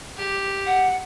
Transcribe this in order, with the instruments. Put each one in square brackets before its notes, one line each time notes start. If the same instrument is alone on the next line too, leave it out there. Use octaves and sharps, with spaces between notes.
[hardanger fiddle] G4
[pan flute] F#5